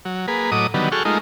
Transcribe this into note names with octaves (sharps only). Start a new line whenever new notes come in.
F#3
A#3 G#4 B4
A2 F#3 D#5 D6 D#6
D3 D#3 F#3 G3 B3
F#4 G#4 A4 G5 C#6 F6
G#3 A3 D#4 F4 A#4